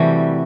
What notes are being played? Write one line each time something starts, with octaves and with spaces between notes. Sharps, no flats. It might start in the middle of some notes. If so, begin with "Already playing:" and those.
Already playing: C3 E3 G3 A3 E4 F#4